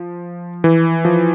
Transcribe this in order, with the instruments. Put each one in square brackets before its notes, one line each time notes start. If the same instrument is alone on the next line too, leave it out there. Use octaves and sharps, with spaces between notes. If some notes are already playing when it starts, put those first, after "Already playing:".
Already playing: [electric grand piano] F3
E3
F3